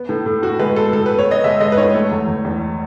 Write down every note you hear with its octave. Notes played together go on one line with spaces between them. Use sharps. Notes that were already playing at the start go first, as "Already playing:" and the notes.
Already playing: B3
A2
A2
A2 F#4
G#3 B4
B3 A4
A2 A4
B3 B4
C#5
B3 D#5
G#3 E5
G#3 D#5
B4
A2 C#5
A3
E2
E2
E2